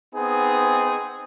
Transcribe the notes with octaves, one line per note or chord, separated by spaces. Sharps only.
B3 C4 D#4 G#4